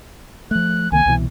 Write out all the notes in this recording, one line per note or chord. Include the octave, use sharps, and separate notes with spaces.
F3 A3 F#6
C2 D#3 A#3 G#5
C2 B2 E3